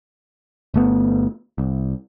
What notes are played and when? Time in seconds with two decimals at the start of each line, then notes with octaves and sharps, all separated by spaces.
0.74 G1 A3 B3
1.58 C2